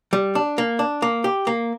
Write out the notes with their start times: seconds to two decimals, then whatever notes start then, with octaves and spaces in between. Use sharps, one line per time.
0.13 G3
0.35 D4
0.58 A#3
0.79 D4
1.02 A#3
1.24 G4
1.47 A#3